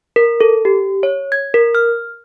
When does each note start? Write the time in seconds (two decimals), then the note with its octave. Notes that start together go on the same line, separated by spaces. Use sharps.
0.16 A#4
0.41 A4
0.65 G4
1.03 C#5
1.32 G#6
1.54 A#4
1.75 F6